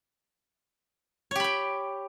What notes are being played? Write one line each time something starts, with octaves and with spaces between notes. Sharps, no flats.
G4 C#5 G5 B5